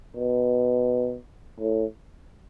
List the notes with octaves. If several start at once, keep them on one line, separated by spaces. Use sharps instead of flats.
B2
A2